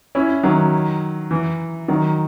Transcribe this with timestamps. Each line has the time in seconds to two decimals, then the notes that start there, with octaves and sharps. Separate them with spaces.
0.15 C#4 E4
0.43 D#3 F#3
1.31 E3
1.88 D#3 F#3